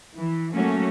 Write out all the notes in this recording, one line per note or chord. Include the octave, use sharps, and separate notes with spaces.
E3
F#3 A3 A#3 C#4 F#4